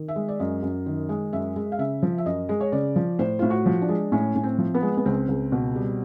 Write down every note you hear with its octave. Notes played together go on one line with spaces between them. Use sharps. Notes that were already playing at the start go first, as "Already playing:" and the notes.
Already playing: D#3
E5
G#3
D5
F#2 D#5
F#2
D#3
G#3
F#2 E5
G#3
F5
C#3 E5
F3
E5
F#2 D#5
G#3
C#5
C#3 D5
F3
A2 C5
A2 F4
F#4
F3
D4
G#3
A2 C#4
A2 C#4
C4
F3
B3
G#3
B3
C#2 C4
C#2
B2
G3